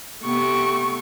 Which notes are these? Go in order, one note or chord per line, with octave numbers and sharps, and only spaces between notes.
C3 A3 B3 G4 C#6